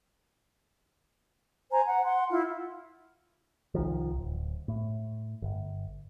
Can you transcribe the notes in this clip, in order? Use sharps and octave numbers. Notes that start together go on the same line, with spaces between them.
C5 G#5 A#5
F#5
F#5 C6
E4 F4
C2 D#3 F3
D1
A2
G1